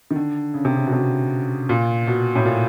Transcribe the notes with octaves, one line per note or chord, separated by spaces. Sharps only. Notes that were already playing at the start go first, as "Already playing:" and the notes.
D#3
D3
C#3
C3
C#3
B2
C3
A#2
B2
A2
A#2